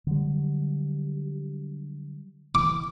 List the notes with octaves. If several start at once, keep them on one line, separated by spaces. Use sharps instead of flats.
D3 F#3 G3
E3 D6